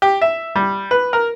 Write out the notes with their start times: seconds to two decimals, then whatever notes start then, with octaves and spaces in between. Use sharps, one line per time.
0.02 G4
0.21 E5
0.56 G3
0.91 B4
1.13 A#4